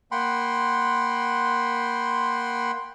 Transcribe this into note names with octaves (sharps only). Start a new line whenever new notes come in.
A#3 F#5 G5 B5 C6